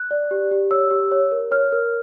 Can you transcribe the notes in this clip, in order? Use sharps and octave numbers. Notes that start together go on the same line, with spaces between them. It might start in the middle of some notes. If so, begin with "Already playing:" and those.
Already playing: F#6
D5
G4
G4
C#5 E6
G4
C#5
A#4
C#5 F6
A#4